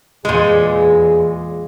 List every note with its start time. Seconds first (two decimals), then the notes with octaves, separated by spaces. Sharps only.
0.25 E2 A#2 G#3 G#4